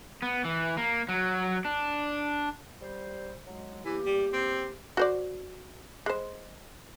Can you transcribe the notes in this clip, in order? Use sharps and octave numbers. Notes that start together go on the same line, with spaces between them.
B3
E3
A#3
F#3
D4
G3 C5
F#3 G#3
E2 E3 A#3 G4
G3
C4
F#4 C5 D5
G#3 C5